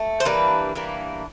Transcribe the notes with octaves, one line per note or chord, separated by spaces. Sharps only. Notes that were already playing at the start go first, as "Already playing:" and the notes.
Already playing: A3
C5
E3 G3 A#3 D4 B4
E3 G3 A#3 D4